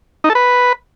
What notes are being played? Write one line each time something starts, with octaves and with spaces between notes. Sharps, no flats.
D#4
A4
B4